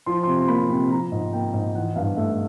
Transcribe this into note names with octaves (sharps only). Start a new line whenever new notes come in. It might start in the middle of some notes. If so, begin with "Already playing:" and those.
F3 C6
C3 C6
C6
A#3 B5
C3
F3 A#5
G#2
A#3 G5
G#2
E3 F#5
G2 F5
A3 E5